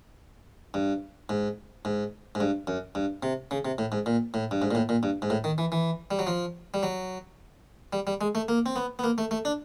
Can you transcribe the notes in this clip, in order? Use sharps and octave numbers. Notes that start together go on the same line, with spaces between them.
G2
G#2
G#2
G#2
G2
F#2
G2
C3
C#3
C3
A2
G#2
A#2
A2
G2
G#2
A#2
A2
A#2
G2
G#2
A2
D#3
E3
E3
G3
F#3
F3
G3
F#3
G3
G3
G#3
A3
A#3
C4
B3
B3
A#3
A3
A3
D4